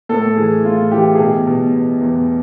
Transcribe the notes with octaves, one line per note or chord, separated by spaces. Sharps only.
A2 A4
E3 G#4
A2 F4
E3 G4
G#4
B2 G4
B2
B2
E2